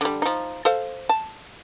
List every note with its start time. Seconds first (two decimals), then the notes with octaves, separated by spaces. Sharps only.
0.01 D3 G3
0.22 F3 D#4
0.65 A4 C5 F5
1.09 A5